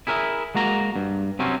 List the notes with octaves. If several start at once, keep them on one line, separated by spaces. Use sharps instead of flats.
E4 G#4 A#4 B4 E5
G#3 A#3 F#4 A#5
G2
C3 F#3 C4 C#4